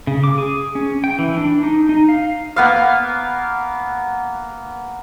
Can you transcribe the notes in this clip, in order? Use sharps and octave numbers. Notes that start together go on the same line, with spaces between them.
C#3
D6
G#4
C#4
G5
E3
D4
D#4
D#4
F5
A#3 B3 F5